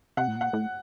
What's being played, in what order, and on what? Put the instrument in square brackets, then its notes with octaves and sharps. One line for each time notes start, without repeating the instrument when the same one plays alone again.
[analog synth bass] C3 [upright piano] F#5
[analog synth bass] A2
[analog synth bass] A#2 [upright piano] F#5
[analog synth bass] A2